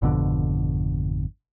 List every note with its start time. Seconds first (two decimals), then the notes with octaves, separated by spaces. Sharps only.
0.02 G#1 F2 B2 D3